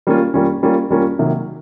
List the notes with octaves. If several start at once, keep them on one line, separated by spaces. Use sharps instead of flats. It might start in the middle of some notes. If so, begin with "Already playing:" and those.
G3 A#3 C#4 F4
G3 A#3 C#4 F4
G3 A#3 C#4 F4
G3 A#3 C#4 F4
C3 D#3 F#3 A#3